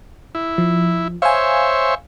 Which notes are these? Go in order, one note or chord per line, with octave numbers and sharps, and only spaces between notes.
E4
F3
C5 C#5 E5 F5 G#5